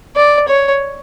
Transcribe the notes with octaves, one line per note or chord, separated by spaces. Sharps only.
D5
C#5